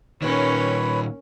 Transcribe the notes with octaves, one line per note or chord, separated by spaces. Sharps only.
A#2 D#3 C#4 A#4 B4 C#5 B5